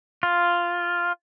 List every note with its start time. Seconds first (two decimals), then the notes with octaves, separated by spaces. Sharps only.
0.23 F4